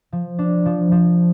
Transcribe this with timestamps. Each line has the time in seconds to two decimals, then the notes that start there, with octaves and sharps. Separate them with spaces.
0.12 F3
0.39 D4
0.66 F3
0.92 F3